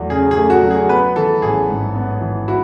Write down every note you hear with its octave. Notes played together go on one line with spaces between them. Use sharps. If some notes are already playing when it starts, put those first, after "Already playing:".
Already playing: E2 F#3 A3
C#3 G#4
G#4
A3
F#4
F#3
G#4
B3 B4
E3 A4
A1 G#4
G#2
B3
E3
E4 F#4